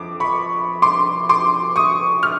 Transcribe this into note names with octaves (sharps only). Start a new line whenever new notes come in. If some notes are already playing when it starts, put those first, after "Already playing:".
Already playing: F2 D6
B5 C#6
C6 D6
C6 D6
C#6 D#6
F6